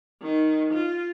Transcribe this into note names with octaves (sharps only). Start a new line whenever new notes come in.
D#3
F4